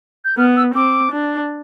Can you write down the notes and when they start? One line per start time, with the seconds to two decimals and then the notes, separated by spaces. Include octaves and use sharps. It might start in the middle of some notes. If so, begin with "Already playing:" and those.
0.25 G6
0.38 B3 F6
0.57 E6
0.75 C4 D6
1.12 D4